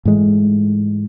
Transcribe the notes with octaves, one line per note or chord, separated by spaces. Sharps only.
G#2 E3 G#3 A3